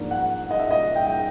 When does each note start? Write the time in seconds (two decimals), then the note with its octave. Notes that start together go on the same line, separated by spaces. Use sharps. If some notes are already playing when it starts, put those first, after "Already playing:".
Already playing: G#2 F3 A#3 D4
0.11 F#5
0.51 D#5
0.60 E5
0.71 D#5
0.96 G5
1.07 G5